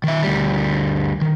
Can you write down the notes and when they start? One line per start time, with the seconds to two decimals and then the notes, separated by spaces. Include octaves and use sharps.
0.04 D#3 E5
0.23 D2 G3
1.22 D#3